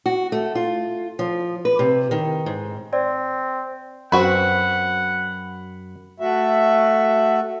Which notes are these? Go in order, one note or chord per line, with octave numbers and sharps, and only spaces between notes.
F#4
A3
F4
F3
B4
C3
D#3
G#2
C4 D5
F#2 C4 F#4 B4 F#5 B5
A3 F#4 E5